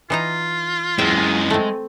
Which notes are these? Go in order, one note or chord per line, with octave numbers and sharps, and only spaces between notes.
E3 D#4 F4 A#5
F#2 E3 G#3 E5 G5
A3 C4